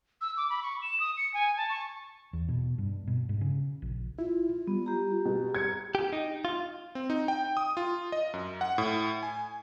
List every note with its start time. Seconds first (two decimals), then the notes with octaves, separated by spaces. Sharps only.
0.21 E6
0.37 D6
0.50 B5
0.62 C#6
0.82 E7
1.00 D#6
1.17 C#7
1.34 G#5
1.57 A5
1.69 C#6
2.33 E2
2.49 B2
2.78 G2
3.07 B2
3.29 G#2
3.41 C#3
3.82 A#1
4.19 E4 F4
4.67 G3 B3
4.86 G4 A#5
5.25 B2 G#4
5.55 G#6 C#7
5.95 G4
6.13 D#4
6.45 F4
6.95 C4
7.10 D#4
7.28 G5
7.57 D#6
7.77 F4
8.12 D#5
8.34 F#2
8.61 F#5
8.78 A2
9.23 G#5